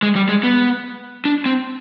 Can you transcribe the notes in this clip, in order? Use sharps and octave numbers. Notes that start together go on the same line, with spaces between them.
G#3
G3
G#3
B3
D4
C4